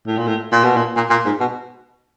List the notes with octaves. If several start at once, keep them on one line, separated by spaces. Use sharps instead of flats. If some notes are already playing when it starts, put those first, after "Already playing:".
A2
A#2
A2
A#2
B2
A#2
A#2
A#2
G#2
B2